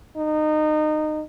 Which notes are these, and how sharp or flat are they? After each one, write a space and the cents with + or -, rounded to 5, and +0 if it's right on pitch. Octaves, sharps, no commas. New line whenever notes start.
D#4 -25